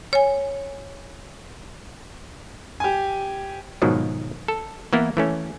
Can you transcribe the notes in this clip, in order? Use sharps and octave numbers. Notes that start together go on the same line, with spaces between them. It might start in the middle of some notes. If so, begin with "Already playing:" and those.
C#5 G#5
G4 G#5
G#2 B2 D#3 F3 F#3
A4
E3 A#3 B3 E4
E3 A3 C#4